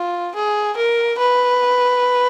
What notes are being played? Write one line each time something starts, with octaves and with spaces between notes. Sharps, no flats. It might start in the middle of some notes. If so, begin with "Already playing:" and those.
Already playing: F4
G#4
A#4
B4